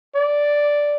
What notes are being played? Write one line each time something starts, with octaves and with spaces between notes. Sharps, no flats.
D5